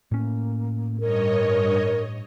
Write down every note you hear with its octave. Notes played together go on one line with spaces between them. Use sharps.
A2 A#3 C#4
G2 A#4 C#5 D#5